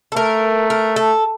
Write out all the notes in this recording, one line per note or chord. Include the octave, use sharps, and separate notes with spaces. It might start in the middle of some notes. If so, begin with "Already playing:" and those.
A4
A3 A#4
A#4
A4